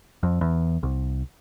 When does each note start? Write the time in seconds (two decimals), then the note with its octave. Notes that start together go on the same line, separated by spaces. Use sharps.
0.23 F2
0.41 E2
0.83 C2